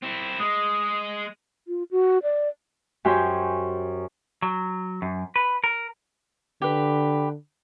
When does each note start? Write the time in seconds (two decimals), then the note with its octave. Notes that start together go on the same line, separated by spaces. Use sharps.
0.03 C4 E4
0.39 G#3 D#6
1.68 F4
1.91 F#4
2.23 D5
3.05 F#2 G4 C5 C#5 G#5 G6
4.42 F#3
5.02 F#2
5.36 B4
5.64 A#4
6.62 D3 G4 B4